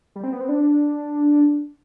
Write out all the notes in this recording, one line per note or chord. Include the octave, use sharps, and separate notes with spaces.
G3
C4
B3
C4
D4